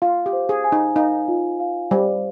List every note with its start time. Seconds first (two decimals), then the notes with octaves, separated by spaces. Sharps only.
0.02 F4 F5
0.26 G4
0.33 C5
0.49 G#4
0.64 G#5
0.72 D#4
0.96 D#4 F5
1.28 F4
1.60 F5
1.91 G3 C5